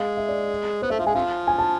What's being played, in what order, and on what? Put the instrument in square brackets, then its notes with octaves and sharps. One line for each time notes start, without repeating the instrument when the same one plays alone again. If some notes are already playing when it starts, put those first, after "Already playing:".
Already playing: [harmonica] G#3 [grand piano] F5
[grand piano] E5
D5
[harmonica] B3 [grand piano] C5
[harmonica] A3 [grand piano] E5
[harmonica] F3 [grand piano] F5
[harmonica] G#3 [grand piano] G#5
[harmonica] C3 F3 [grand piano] F5
[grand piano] G#5
A5